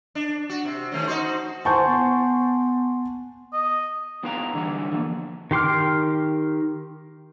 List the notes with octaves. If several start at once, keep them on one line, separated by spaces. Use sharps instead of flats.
D4
F#4
C3
D#3 A3 C#4
D#4 F#4 C5
C5 F#5 G#5 A5 C6 C#6 G6
B3
D#5
B3 E4 B4 F5 G5 A#5
D3 E3 G3 B3
D3 F3 A#3
D#3 G4 C6 D6 F6